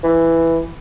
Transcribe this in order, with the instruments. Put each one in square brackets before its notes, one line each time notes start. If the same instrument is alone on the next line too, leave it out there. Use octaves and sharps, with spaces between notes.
[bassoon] E3